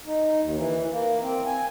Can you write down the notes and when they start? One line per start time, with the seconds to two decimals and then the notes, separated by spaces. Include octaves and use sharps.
0.06 D#4
0.41 D#2
0.57 E3
0.92 A#3
1.21 C4
1.46 G#5